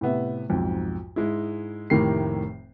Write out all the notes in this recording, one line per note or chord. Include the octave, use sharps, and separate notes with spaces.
A2 C3 B3 E5
B1 F2 G#2
G#2 G#3 E4
F1 A2 D#3 A#3 G4 C7